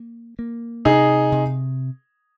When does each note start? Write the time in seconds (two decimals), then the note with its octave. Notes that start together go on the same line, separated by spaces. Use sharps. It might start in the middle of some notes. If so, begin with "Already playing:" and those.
Already playing: A#3
0.39 A#3
0.85 C3 D#4 G#4
1.32 C3